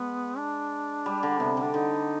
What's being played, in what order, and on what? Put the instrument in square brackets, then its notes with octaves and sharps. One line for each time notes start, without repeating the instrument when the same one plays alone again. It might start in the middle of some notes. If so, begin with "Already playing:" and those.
Already playing: [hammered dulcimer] G#3 [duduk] B3
[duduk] D4
[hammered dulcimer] G3
D3
[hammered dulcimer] C3 [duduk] B3
[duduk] C4
[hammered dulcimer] D3
[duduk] D4
[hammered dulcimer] D3 [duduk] D#4